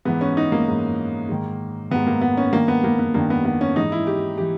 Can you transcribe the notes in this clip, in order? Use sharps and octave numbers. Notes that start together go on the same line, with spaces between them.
G#2 E3 B3
C#4
D#4
A#3
G#2 E3
G#2 D#3
G#2 D#3 B3
A#3
B3
C#4
G2 D#3 A#3
B3
A#3
B3
G2 D#3 A#3
B3
B3
C#4
G#2 E3 D#4
E4
G4
E3 G4